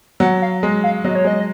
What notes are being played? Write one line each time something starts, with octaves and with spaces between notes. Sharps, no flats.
F#3 F#5
F5
G#3
F5
F#3 D#5
C#5
G#3
D#5